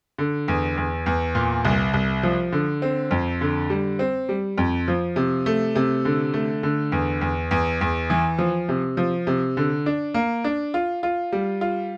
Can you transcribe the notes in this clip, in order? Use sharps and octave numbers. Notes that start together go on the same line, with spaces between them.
D3
E2
E2
E2
A#2
C2
C2
F3
D3
C4
F2
D3
G3
C4
G3
F2
F3
C3
A3
C3
D3
A3
D3
E2
E2
E2
E2
E3
F3
C3
F3
C3
D3
D4
A#3
D4
F4
F4
G3
F4